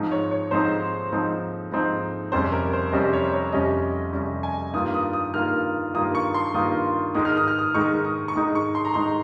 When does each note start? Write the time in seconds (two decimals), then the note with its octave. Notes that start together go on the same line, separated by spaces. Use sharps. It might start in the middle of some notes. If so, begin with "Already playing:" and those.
Already playing: G#2 F3 C4 D#4
0.12 C#5
0.31 C#5
0.51 G#2 F3 C4 D#4 C5
1.12 G#2 F3 C4 D#4
1.72 G#2 F3 C4 D#4
2.32 F2 C3 G3 C#4 C5
2.52 A#4
2.73 C5
2.92 F2 C3 G3 C#4 D#5
3.13 C#5
3.33 C#5
3.52 F2 C3 G3 C#4 D#5
4.13 F2 C3 G3 C#4
4.43 G#5
4.73 G2 D#3 A#3 F4 D#6
4.94 D#6
5.13 D#6
5.34 G2 D#3 A#3 F4 F6
5.94 G2 D#3 A#3 F4 D#6
6.15 C#6
6.34 C6
6.54 G2 D#3 A#3 F4 D#6
7.15 G#2 D#3 G#3 D#4 D#6
7.25 F6
7.37 D#6
7.48 F6
7.59 D#6
7.74 G#2 D#3 G#3 D#4 C#6
8.05 D#6
8.28 C#6
8.35 G#2 D#3 G#3 D#4 D#6
8.55 C#6
8.75 C6
8.85 A#5
8.94 G#2 D#3 G#3 D#4 C6